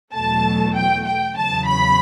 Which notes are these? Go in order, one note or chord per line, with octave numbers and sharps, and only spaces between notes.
E2 B2 F#3 A3 A5
G5
G5
E2 C#3 F#3 A5
B5